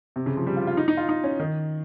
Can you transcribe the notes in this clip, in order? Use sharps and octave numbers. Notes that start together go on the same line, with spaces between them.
C3
C#3
F3
G3
F4
F4
D#4
D#4
F4
D#4
C#4
D#3